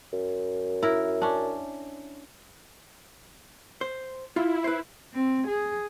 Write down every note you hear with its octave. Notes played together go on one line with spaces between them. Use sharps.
F#2
E4 A#4
C#4 D4
C5
E4 F4
B4 C5
C4
G#4